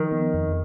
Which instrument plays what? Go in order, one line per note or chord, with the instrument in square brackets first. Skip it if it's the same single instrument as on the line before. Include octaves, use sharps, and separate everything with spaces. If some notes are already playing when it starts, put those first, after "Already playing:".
Already playing: [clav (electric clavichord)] D#3 [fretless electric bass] F3
[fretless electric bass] B3
F2